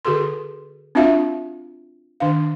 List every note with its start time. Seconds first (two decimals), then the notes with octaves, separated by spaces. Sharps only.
0.05 D3 F#4 G#4 A4 C6
0.95 C4 D4 F4 F#4 E5 F5
2.20 D#3 D4 F5